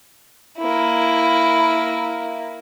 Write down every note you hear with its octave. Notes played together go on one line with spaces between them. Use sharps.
A#3 E4